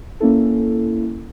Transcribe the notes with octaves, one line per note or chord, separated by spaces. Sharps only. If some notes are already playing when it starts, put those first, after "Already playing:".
A#3 C#4 E4 A4